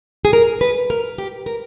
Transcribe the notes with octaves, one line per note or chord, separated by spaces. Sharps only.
G#4
A#4
B4
A#4
G4
A#4